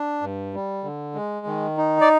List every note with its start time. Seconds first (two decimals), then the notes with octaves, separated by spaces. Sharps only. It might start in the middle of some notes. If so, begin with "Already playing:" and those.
Already playing: D4
0.22 G2
0.54 G3
0.84 D3
1.15 G#3
1.46 D#3
1.77 D#4
2.01 D5